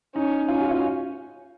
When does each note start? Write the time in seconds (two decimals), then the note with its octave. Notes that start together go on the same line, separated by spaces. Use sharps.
0.16 C#4 D#4
0.49 C#4 F4
0.61 F#4
0.71 F4